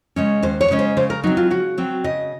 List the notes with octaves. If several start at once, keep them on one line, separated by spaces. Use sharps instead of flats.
C#3 G#3 C#4
D#2 C5
C#5
C#3 G#3 C#4
C5
C#3 C5
A#4
F#3 C4 D#4
F4
C#3 F#4
F#3 C4
C#3 D#5